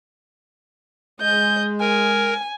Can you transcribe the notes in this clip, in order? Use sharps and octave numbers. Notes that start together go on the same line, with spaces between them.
G#3 D#5 G6
A#4 G#5